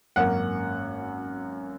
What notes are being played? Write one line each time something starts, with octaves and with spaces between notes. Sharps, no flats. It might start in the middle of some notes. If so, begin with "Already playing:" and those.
G#1 F#2 F#3 A#3 C#4 F#5